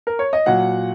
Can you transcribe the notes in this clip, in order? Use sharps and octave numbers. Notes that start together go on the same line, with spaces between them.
A#4
C#5
D#5
A#2 F#3 F#5